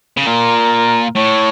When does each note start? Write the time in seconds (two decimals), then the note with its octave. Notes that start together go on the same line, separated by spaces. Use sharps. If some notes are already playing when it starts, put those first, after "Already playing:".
0.17 C#3
0.26 A#2 A#4
1.16 A2 C#5